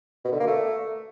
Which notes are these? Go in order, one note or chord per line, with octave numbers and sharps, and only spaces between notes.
B2
D3
A#3
A3